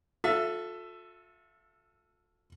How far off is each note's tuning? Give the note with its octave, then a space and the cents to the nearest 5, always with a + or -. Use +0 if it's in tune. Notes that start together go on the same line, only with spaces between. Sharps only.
F4 +45 A4 +0 E5 +15